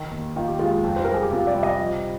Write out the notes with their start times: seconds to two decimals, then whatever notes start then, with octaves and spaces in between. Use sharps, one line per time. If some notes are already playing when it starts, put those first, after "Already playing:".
Already playing: D#3
0.11 D#2
0.36 D#3 F4
0.47 G4
0.59 G#3 F4
0.71 F4
0.84 F2
0.96 C5
1.05 G3 A#4
1.14 G#4
1.23 G4
1.31 C3 F4
1.47 D5
1.55 G3
1.63 D#5
1.79 F3